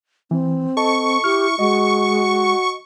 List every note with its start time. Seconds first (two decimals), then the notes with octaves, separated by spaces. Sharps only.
0.31 E3 C4
0.77 A4 D#5 A5 C#6
1.24 E4 G4 F6
1.59 G#3 F#4 D#5